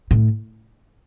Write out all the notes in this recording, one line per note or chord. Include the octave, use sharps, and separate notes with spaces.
A2